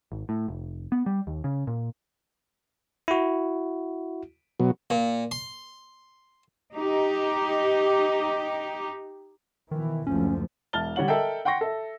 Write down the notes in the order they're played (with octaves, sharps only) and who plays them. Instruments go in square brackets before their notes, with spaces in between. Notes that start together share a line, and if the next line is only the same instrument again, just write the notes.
[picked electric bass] G#1
A2
F1
B3
G3
D#2
C#3
A#2
[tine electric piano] E4 F#4
[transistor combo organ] B2 F#3
[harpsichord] A#2
C6
[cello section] D#4 G4
[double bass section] B2 E3 [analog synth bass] D#3
[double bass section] F#1 D2 F3 [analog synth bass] C#4
[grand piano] E1 E5 A5 F6 A6 G7
D3 G3 C#5 F#5 F#7
A4 A#4 D#5 E5 G5
F#5 G5 C6 C#6 A#6
A4 E5